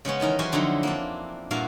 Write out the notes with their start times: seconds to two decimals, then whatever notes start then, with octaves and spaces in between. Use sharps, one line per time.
0.05 C#3 G#3 B3 C#4
0.20 D#3 E3 D#4 A#4
0.39 E3 F#3 F#4 G4 C5 G#5
0.52 F2 D3 F#3 G#3 D#4 E4
0.83 A#3 C4 D4
1.51 G2 A#2 E4 F#4 A#4 F5